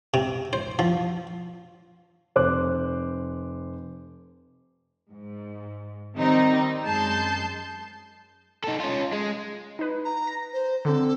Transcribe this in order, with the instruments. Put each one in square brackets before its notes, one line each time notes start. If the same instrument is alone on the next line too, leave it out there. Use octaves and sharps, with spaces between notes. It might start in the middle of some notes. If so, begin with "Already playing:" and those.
[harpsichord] C3
C5
F3
[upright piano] F1 C5 D6 F#6
[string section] G#2
D#3 G3 C4 D#4
F#2 G#3 A5 G6 C7
[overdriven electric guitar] D#4 A4
C#4 F4
G#3
[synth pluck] D#4 B4
[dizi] A#5
[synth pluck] A#6
[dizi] C5
[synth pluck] D3 C4 [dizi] A4